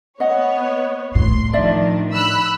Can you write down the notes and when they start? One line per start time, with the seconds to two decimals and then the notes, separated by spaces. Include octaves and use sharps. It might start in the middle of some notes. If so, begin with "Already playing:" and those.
0.20 B3 C#5 D#5 F#5
1.15 A2 C6
1.53 D#3 F3 D4 D5 E5
2.12 B5 E6 F#6